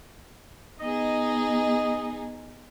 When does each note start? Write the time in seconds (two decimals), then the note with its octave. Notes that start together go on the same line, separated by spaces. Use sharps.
0.80 B3 D#4 G#4 D#5